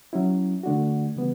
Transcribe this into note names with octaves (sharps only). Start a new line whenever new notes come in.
F#3 C#4 E4
D3 A3 D4 F#4
C#3 E3 G3 B3